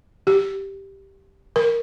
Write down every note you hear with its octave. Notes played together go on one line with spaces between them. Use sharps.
G4
A#4